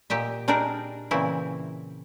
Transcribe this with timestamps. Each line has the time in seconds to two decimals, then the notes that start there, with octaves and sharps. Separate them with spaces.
0.10 A#2 G4 D#5 E5
0.48 G3 D4 D#4 G#4 A#4
1.11 A#2 C#3 E3 C4 E4